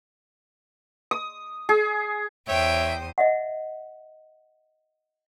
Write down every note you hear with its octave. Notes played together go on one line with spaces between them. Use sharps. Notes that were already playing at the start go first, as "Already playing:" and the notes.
D#6
G#4
E2 C5 C#5 E5 G5 D#6 D7
D#5 E5 F#5